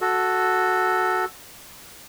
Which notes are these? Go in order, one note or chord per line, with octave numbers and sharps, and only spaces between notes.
F#4 A4